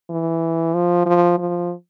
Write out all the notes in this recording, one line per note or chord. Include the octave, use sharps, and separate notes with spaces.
E3
F3
F3
F3